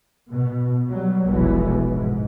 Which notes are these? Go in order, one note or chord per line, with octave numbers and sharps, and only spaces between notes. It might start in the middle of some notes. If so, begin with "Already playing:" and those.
B2
F#3 G3
F1 B1 B2 E3 G#3 B3
G#2